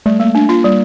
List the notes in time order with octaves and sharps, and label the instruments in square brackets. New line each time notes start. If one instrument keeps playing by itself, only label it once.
[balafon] G3 [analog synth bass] A3
[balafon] A#3
D4
[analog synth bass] A#3 [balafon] F4
[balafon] G3